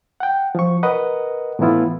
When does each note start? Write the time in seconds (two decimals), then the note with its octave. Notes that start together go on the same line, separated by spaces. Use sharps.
0.20 F#5 G5
0.55 F3 C#6
0.83 A#4 B4 D#5 F#5
1.59 A2 E3 A3 B3 E4 F4